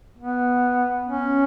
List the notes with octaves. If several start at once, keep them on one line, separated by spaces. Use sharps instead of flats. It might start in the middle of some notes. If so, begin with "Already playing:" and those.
B3
C#4